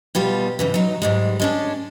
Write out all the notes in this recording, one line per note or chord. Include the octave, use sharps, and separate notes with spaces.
B2 G3 F4
G#2 C#3 E3
F#3 D#4
G#2 G3 G#3
G#3 C#4 D4